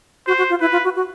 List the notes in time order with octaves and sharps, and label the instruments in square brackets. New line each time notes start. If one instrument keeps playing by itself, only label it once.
[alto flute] F#4 [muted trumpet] C5
[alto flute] F#4
F4
[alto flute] E4 [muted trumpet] B4
[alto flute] F4
F#4
F#4